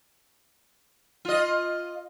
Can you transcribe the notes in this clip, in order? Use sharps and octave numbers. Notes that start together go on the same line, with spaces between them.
F4 D#5